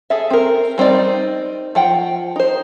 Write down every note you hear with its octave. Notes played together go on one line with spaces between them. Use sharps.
G#4 A4 E5
C4 A#4
G3 C4 D#4 D5
F3 F#5 G5
D#4 C5